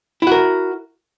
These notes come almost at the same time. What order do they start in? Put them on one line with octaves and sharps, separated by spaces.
E4 F#4 A#4